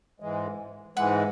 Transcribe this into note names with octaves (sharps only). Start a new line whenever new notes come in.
G#2 E3 G#3
G#2 E3 G#3 F#5